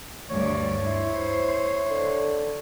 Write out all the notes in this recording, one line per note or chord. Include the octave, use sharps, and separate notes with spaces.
D2 G2 C#5 D5
E4 C5
D3